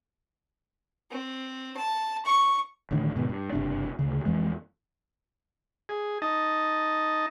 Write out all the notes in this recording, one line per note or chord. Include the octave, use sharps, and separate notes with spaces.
C4
A5
C#6
A1 A2 D3 D#3
G#2 B2 D#3
G2
F#1 G2 C3 D4
D2 C#3
F2 E3 G#3
G#4
D#4 D#5 A5